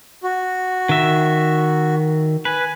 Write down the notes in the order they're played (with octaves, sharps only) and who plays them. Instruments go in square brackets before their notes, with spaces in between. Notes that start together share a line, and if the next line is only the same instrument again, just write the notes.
[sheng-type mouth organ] F#4
[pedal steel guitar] D#3 E5
[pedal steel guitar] B4 [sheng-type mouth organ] G#5